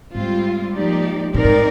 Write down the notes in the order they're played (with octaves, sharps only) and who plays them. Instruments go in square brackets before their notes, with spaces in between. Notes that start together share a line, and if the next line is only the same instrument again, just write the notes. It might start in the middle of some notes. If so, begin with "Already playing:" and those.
[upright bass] G#2 [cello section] G3 C4 F4
[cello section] F3 A#3 D#4 G4 D5
[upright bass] A#2 [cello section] C4 D#4 A#4 D5
[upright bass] G#2